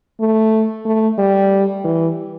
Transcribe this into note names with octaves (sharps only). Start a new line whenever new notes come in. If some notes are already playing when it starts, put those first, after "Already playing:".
A3
A3
G3
E3